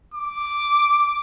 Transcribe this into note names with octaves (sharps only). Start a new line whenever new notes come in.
D6